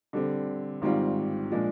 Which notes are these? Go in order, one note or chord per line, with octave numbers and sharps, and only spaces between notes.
D3 G3 C4
G#1 G#2 G3 C4 F4
A#2 F3 G#3 D4